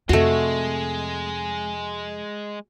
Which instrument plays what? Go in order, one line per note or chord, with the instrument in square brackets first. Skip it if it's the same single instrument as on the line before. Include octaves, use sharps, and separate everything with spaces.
[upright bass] F2 C3 [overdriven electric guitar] G#3 [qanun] A3 F#4